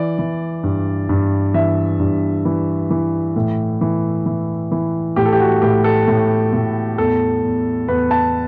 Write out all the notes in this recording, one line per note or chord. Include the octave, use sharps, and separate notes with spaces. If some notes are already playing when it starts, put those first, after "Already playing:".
Already playing: E3 D5
E3
G2
G2
E3 E5
G2
E3
E3
A2
E3
E3
E3
A2 G4
A4
G4
F#4
A2 G4
A4
A2
A2
E2 A4
E2
E2 B4
A5